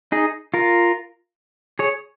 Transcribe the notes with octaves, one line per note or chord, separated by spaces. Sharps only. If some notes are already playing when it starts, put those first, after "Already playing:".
D#4 G#4
F4 A#4
G#4 C#5